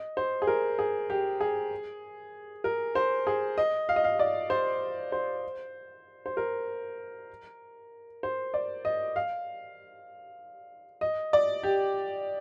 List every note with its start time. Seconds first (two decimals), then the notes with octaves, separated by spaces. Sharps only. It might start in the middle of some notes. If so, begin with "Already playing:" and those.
Already playing: D#5
0.17 C5
0.42 G#4
0.47 A#4
0.79 G#4
1.10 G4
1.41 G#4
2.64 A#4
2.95 C5
3.27 G#4
3.58 D#5
3.89 F5
3.96 D#5
4.04 F5
4.19 D5
4.50 C5
5.12 C5
6.26 C5
6.37 A#4
8.23 C5
8.54 D5
8.85 D#5
9.16 F5
11.01 D#5
11.33 D5
11.63 G4